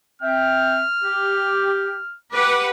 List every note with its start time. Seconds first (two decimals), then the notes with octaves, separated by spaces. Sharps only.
0.22 C4 E5 G5 F6
1.04 G4
2.33 G4 B4 F#5 D6